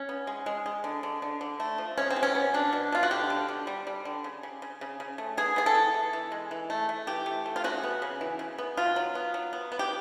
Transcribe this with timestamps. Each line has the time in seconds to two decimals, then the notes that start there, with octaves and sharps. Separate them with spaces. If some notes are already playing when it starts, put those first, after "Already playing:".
Already playing: C#4
0.09 B3
0.27 G#3
0.46 G#3
0.66 G#3
0.84 D3
1.03 D3
1.22 D3
1.41 D3
1.60 A3
1.78 F3
1.97 G#3 C#4
2.10 C4
2.16 B2
2.23 C#4
2.35 B3
2.54 B2 D4
2.73 B2
2.92 B2 F4
3.03 F#4
3.11 D3 G4
3.30 D3
3.48 D3
3.67 G3
3.87 G3
4.05 D3
4.24 C#3
4.43 C#3
4.62 C#3
4.81 C#3
5.00 C#3
5.18 A3
5.37 B3 G#4
5.56 B3 G#4
5.66 A4
5.75 E3
5.94 E3
6.13 E3
6.32 G#3
6.51 E3
6.70 A3
6.89 A3
7.07 E3 G4
7.26 A3
7.46 A3
7.56 F4
7.64 C#3 F#4
7.84 B3
8.02 C#3
8.21 E3
8.39 C#3
8.58 B3
8.77 B2 F4
8.96 F#3
9.15 B3
9.34 F#3
9.53 B3
9.72 B3
9.79 G4